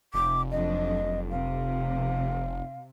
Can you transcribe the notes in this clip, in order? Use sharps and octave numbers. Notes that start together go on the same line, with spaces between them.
F1 D6
F2 F#3 D4 D#5
C3 F5